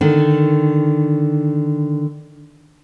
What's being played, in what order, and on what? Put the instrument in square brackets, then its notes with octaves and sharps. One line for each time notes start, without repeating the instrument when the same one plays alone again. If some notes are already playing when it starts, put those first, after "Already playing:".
[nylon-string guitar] D3 D#3